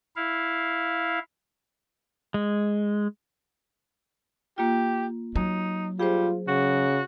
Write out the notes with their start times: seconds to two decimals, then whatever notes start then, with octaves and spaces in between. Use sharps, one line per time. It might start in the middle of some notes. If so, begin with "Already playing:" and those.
0.16 E4 F5
2.34 G#3
4.58 A#3 F4 G4
5.35 F#3 D#4
6.00 G3 F4 G#4 C5
6.48 C#3 F#4